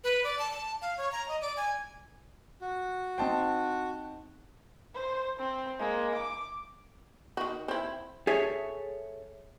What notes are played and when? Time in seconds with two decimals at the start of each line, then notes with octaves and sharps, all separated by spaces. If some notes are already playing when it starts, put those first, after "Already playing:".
0.04 B4
0.24 D5
0.39 A5
0.51 A5
0.82 F5
0.97 C#5
1.12 A#5
1.28 D#5
1.41 D5
1.57 G#5
2.61 F#4
3.18 C4 D#4 C5 G5 A5
4.95 C5
5.39 C4
5.79 G#3 A#3
6.14 D6
7.37 D#3 F#4
7.68 C4 E4
8.27 G#4 A4 C#5 E5